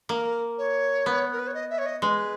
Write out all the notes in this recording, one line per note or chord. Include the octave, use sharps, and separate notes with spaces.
A#3 A#4
C#5
B3
A#4
B4
C#5
D#5
E5
C#5
D#5
G#3 B4